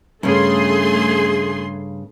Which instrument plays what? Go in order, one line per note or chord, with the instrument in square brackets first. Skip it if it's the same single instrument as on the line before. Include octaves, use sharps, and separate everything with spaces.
[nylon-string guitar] G2 C#3 [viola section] A3 G#4 C6